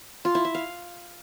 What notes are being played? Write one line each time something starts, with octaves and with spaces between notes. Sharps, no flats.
F4
E4
E5
F5